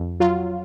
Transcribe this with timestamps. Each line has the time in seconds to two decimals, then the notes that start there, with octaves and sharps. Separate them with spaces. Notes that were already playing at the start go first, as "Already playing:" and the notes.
Already playing: F2
0.20 F#3 F4